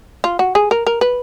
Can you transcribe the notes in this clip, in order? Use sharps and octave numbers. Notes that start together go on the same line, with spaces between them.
F4
F#4
G#4
A#4
A#4
B4